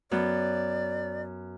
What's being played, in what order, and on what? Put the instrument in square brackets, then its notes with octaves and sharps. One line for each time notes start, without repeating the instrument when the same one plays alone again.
[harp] F#2 B3 [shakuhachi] D5